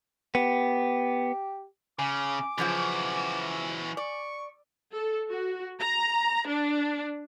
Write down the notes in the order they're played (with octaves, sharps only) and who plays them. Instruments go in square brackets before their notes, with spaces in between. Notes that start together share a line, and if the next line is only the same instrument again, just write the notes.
[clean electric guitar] B3 [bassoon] G4
[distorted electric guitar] C#3 [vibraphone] G#5 [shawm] D6
[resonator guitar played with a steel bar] F#2 C#3 F3 [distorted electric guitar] E3 F#4
[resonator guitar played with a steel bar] D5 [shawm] C#6
[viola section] A4
F#4
A#5
D4